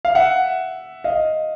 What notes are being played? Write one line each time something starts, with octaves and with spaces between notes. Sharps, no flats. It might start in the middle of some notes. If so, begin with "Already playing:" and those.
F5
E5 F#5
D#5 F5